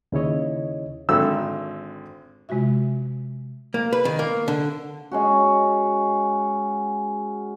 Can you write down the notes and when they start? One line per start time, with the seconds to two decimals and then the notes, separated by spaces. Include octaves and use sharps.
0.12 D#2 C#3 E4 C#5 D#5
1.09 G#1 D3 E6
2.49 C3 G#3 F4 F#4 E5
3.74 A#3
3.93 B4
4.05 D#3
4.19 A#3
4.48 D3
5.11 G#3 C#4 F#4